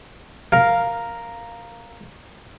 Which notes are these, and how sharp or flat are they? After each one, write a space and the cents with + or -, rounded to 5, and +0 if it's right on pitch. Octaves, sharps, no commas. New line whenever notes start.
A#4 +0 F5 +0